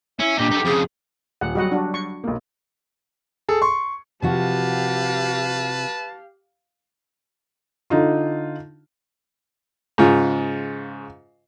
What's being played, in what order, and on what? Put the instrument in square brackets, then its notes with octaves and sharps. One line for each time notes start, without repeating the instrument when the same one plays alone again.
[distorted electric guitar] C#4 [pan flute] E4 [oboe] E5
[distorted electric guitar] A#2 D#4 [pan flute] D4 [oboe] G4
[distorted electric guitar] D#4 A4
[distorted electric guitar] F2 C#3 [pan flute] G#4
[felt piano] D#1 [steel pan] F#5
[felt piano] F#3 G3 [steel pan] F#4 D#5 F#5
[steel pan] D4 F#4
C#6
[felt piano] B1 A#3
[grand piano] G#4 A4
C6 C#6
[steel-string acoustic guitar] C3 F3 F#4 [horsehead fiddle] G4 F5 [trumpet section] B4 A5
[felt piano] D3 D#4 F4
[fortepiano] G#2 C#3 F4